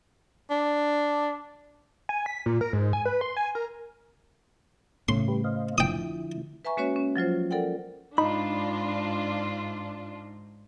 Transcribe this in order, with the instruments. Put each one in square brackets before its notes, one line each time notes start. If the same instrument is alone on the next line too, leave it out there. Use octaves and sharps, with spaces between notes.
[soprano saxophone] D4
[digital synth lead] G#5
B6
A#2
A#4
G#2
G#5
B4
C6
G#5
A#4
[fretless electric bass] A2 C#3 [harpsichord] C6
[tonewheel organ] G3 G4 B4
C5 D#5 F5
[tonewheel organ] D3 F3 E4 [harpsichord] G5 D#6
[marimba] B4 E5 G#5 A#5 C#6
G#3 A#3 C#4 F#4 B4 C#5
C#4
F3 F#3 F4 C5
A4 A#4 D5 F#5 G5
[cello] G#2 [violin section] D4 F4 [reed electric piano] D#4 [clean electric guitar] B5